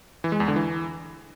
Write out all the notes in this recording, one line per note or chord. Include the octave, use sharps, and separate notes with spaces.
E3
G#3
E2
D3
E3